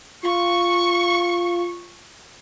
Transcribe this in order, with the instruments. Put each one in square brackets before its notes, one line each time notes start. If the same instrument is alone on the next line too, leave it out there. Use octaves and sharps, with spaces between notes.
[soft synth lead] F4 [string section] C#6